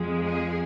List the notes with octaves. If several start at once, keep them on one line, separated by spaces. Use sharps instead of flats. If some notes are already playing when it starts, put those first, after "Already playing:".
Already playing: F2 F3 G#3
G#4